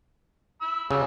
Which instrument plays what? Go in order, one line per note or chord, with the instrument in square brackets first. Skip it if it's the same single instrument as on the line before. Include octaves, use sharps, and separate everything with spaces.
[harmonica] B5 E6
[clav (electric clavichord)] C#3 [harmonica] F#3 G3 E6